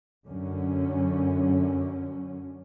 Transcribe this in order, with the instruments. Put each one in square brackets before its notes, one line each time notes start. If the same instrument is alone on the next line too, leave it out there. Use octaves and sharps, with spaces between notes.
[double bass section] F#2 D3 C#4